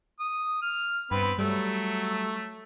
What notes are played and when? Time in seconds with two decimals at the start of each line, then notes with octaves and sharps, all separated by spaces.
0.20 D#6
0.62 F6
1.11 G2 B3 C4 B4
1.39 F#3 G3 A3